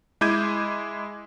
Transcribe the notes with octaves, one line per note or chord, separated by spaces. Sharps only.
G#3 E4 D6 G6 G#6 D#7